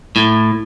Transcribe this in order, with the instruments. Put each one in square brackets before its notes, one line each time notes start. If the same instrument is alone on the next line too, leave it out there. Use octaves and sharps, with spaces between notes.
[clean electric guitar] A2